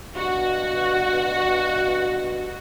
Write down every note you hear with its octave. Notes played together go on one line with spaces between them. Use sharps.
G2 B2 F#4